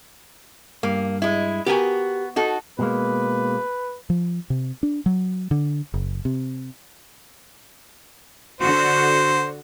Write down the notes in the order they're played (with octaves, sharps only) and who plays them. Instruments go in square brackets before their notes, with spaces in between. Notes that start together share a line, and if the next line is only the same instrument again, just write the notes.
[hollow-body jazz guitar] G2 [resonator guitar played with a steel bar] A#3
[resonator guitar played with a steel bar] G#3 E4
[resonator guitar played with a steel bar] B3 F#4 [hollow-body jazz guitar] G4 A#4 G#5
[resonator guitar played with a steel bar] D#4 F#4 A4
[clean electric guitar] B2 G#3 A#3 [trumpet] B4
[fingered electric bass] F3
C3
D4
F#3
D3
F#1
C3
[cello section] D3 F#4 [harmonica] C5